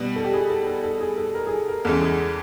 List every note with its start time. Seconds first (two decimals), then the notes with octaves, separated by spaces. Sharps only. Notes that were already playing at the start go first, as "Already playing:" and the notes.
Already playing: B2 G3 B3
0.16 A4
0.24 G4
0.33 G#4
0.49 A4
0.67 A4
0.83 A4
1.00 G#4
1.17 A4
1.34 A#4
1.46 G#4
1.51 A4
1.68 A#4
1.85 E2 C#3 E3 G#3 A4
2.02 G#4